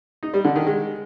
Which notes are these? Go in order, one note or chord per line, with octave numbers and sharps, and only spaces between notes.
D#4
G3
D3
D#3
G#3